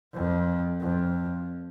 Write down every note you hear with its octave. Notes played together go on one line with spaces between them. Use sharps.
F2
F2